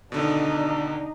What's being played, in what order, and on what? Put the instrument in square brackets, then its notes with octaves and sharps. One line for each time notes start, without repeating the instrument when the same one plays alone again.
[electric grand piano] B2 D3 D#3 [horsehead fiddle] D4 D#4